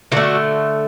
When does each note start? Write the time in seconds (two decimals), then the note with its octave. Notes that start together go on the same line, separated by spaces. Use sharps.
0.12 D3 A3 D4 F#4